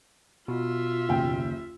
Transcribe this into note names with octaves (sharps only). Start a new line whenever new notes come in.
B2 F4 E5
F#1 D#2 G5